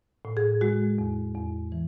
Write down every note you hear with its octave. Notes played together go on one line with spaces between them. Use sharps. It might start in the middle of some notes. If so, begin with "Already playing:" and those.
A2
G#4
G#3 F#4
E2
E2
E3